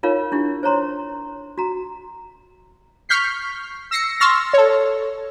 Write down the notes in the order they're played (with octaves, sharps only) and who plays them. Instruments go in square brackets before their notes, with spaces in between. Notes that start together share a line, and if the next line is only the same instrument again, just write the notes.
[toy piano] D#4 F4 A#4 C#5 F5
D4 E4 G4
C5 C#5 A#5 C6
F#4 A#5
[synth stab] C#6 F6 G6 B6 C7
E6 A#6 C7 C#7
C6 C#6 E6 F6 A6 A#6
A4 C#5